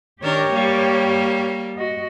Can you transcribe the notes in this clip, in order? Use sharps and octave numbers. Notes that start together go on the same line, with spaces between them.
D#3 D4 G4 A#4 C#5
G3 A#3
F#4 D#5